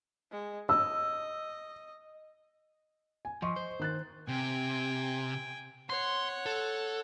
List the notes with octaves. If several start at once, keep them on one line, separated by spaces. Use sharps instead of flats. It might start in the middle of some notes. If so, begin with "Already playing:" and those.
G#3
D#5 E6
G#5
F3 D#5 C6 C#6
C5
D#3 F#6 A6
C3 G5 G#5
C#5 F#5 C6
A4